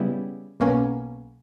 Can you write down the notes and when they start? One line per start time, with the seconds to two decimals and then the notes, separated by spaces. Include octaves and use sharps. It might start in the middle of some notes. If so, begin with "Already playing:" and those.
Already playing: C#3 G3 B3 E4
0.60 B1 B2 A#3 C#4